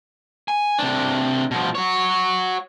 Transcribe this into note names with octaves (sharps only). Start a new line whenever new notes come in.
G#5
C3 D4
B2 F3
F#4 C#5